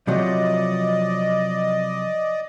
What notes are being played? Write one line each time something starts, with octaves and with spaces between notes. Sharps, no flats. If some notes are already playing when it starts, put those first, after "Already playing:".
C3 F3 F#3 D5 D#5